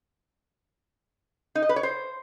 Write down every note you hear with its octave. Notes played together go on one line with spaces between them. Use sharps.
D#4
D#5
B4
C#5
C5